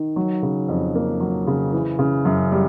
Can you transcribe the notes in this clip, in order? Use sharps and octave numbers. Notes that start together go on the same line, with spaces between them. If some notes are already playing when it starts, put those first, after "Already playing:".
Already playing: D#3
F#3
C#3
F2
A#3
F#3
C#3
E3
C#3
F#2
G3